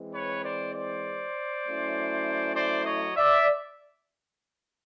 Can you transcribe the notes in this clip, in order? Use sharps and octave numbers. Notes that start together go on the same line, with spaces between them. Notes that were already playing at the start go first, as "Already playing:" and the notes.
Already playing: E3 G#3 C4
B4 C#5
C5 D5
C5 D5
F#3 A3 C#4 E4
C5 D5
C#5 D#5
D5 E5